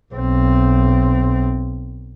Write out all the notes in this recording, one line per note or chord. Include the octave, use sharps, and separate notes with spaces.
B1 C4